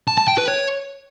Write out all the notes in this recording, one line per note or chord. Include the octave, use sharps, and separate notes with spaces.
A5
A5
G5
B4
C#5